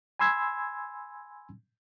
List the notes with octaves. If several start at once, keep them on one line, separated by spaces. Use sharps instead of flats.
G#5 B5 C6 E6 G#6